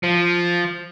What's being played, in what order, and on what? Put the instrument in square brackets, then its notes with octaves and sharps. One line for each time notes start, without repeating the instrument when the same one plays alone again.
[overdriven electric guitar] F3